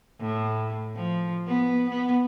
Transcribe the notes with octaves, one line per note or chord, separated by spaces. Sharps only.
A2
F3
B3
B3